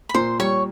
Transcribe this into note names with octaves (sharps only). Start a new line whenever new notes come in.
B5
A#2 C5 C6
G3 C#5 C#6